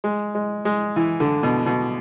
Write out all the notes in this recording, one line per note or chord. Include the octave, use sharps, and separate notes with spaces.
G#3
G#3
G#3
E3
D3
B2
B2